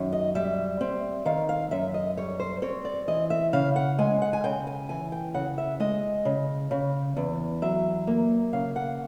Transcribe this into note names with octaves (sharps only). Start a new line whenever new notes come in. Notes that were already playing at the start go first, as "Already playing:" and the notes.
Already playing: F#2 D#3
D#5
G3 E5
C4
D#3 F5
F5
F#2 E5
D#5
G3 C#5
C5
C4 C#5
D5
E3 D#5
E5
C#3 F5
F#5
G#3 G#5
F#5
G#5
C#3 G5
G#5
E3 G#5
G5
C#3 F#5
E5
G#3 D#5
C#3
C#3
E2
F#3 E5
A#3
C#3 F5
F#5